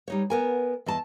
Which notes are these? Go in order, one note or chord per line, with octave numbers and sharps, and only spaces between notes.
G3 D#4 C#5
B3 A#4 G#5
E2 D#5 A5